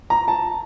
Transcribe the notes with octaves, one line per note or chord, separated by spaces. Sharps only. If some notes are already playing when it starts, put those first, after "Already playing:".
A#5
A5